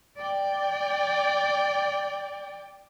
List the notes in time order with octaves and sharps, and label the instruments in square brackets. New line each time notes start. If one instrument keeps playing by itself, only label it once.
[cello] D5 G5